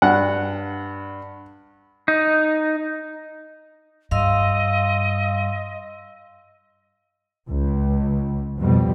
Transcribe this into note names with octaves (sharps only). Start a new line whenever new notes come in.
G2 F#5
D#4
G2 D#5 F5 C6 E6
C#2
F2 B2 G3